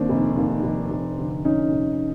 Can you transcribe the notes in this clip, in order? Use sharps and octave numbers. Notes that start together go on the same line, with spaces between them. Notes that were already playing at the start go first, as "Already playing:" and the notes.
Already playing: D#2 C4 D4
F1
D#2
F1
F1
D3
F1 C#4 D#4
F1